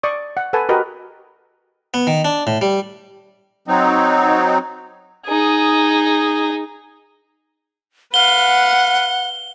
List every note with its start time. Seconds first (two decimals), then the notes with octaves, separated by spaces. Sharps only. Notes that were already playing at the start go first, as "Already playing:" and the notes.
0.03 D5 C#6 D#6
0.37 F#5
0.53 A4 B4 F#5 G#5 A5
0.69 F#4 G4 A#4 B4 D#5
1.94 B3
2.07 D#3
2.25 D4
2.47 A2
2.61 G3
3.68 F#3 C4 D#4
5.26 D#4 G#4
8.14 B4 F5 F#5 G7